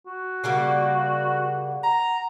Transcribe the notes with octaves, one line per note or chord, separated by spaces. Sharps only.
F#4
C#3 G3 A#3 F#5
A#5